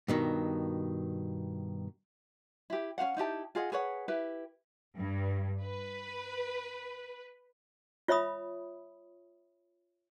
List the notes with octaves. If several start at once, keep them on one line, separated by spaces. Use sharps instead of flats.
G2 B2 D#3
E4 G4
C#4 F#4 F5 F#5
D#4 E4 G4 A5
F4 G#4 D#5 F#5
G#4 B4 C#5 F#5
E4 G4 B4
G2
B4
F4 C#5 E5 B5 D#6